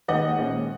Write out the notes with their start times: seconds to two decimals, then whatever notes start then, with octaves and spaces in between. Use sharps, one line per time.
0.08 D#2 D#3 G#3 D#5 F#5
0.39 A#1 A#2 G#3 C#4